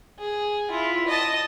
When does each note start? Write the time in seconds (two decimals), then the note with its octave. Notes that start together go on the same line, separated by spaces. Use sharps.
0.19 G#4
0.70 E4 F4
1.07 D#5 A5